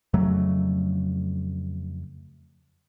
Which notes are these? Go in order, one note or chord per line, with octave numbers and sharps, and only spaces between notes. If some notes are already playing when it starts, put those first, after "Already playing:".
F2 C#3 F#3 A3